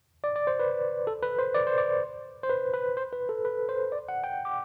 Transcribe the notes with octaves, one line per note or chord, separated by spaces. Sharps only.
D5
D5
C5
B4
A4
B4
C5
D5
C5
D5
C5
B4
B4
C5
B4
A4
B4
C5
D5
F#5
G5
D6